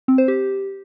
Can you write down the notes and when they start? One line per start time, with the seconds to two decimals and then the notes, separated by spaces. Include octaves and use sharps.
0.08 C4
0.18 C5
0.28 G4